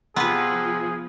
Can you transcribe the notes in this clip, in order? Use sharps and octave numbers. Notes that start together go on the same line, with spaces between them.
C3 F3 B3 G#4 B4